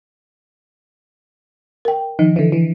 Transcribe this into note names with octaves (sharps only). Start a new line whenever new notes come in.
A#4 G5
D#3 F3
D3 E3
E3